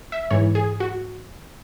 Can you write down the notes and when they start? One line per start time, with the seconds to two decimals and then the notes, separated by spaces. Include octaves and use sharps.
0.12 E5
0.31 G#2 E3 C#5
0.55 G#4
0.80 F#4